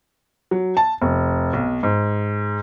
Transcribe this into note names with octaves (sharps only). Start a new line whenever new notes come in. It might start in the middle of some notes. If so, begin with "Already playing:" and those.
F#3
A5
F1
B1
G#2